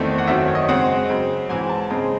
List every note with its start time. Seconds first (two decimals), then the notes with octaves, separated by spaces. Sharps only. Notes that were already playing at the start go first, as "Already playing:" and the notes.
Already playing: E2 D#3 A3 C4
0.18 F#5
0.27 F#2 D#3 F#3 C4 E5
0.48 C#5
0.55 D#5
0.68 C#3 G#3 C4 F#5
1.09 C#3 F#3 C4
1.49 G#2 E3 C4 G#5
1.70 A5
1.90 C#3 G#3 C4